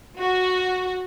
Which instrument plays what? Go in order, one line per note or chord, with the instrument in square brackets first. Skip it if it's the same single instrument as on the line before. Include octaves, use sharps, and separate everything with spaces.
[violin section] F#4